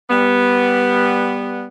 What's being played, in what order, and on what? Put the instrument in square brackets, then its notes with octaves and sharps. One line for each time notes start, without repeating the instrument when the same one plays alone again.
[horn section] G3 B3